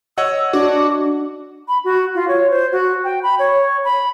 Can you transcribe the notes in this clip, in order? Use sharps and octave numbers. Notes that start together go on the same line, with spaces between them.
C#5 D#5 F#5 E6
D4 F#4 D6
B5
F#4
F4
C#5
C5
F#4
G5
B5
C#5
B5